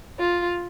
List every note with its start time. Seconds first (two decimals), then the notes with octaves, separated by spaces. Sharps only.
0.19 F4